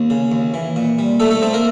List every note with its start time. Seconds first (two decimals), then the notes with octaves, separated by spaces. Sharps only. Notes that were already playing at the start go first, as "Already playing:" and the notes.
Already playing: D#2 A#3
0.10 C#3
0.32 D#2
0.54 E3
0.76 A#2
0.99 G3
1.20 A3 D#4 A4
1.31 A3 A4
1.42 A3 C4 A4
1.53 A#3 A#4